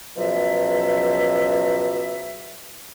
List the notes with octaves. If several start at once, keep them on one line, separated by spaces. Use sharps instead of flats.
C#2 B2 F3 F#3 E5